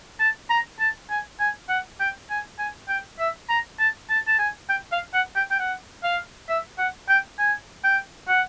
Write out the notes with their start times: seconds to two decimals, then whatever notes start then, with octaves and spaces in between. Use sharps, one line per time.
0.20 A5
0.50 A#5
0.79 A5
1.10 G#5
1.40 G#5
1.69 F#5
2.00 G5
2.30 G#5
2.59 G#5
2.89 G5
3.19 E5
3.49 A#5
3.79 A5
4.10 A5
4.27 A5
4.39 G#5
4.69 G5
4.92 F5
5.14 F#5
5.36 G5
5.51 G5
5.59 F#5
6.03 F5
6.49 E5
6.78 F#5
7.09 G5
7.39 G#5
7.84 G5
8.28 F#5